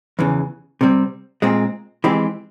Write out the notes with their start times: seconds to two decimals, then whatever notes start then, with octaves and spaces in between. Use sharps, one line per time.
0.19 E2 C#3 E3
0.81 C3 G3 C4
1.42 A#2 G#3 C4
2.04 E3 G#3 C4 G4